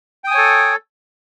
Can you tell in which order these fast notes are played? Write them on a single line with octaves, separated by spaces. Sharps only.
G5 D#6 G#5 C#5 A4